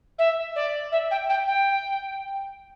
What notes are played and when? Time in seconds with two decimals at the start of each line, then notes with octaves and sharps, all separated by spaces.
0.18 E5
0.56 D5
0.92 E5
1.11 G5
1.29 G5
1.47 G5